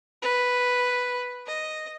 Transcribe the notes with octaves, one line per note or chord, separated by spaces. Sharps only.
B4
D#5